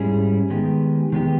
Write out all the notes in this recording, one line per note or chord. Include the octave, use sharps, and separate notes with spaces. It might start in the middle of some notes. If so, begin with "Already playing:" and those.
Already playing: G#2 G3 C#4 E4 G#4
D#3 G#3 B3 G4
D#3 G#3 B3 G4